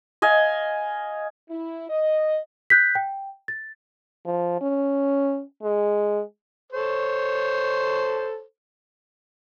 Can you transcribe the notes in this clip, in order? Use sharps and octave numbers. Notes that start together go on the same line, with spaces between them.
D#5 F5 G#5
E4
D#5
F#6 G6 B6
G5
A6
F3
C#4
G#3
A4 C5 C#5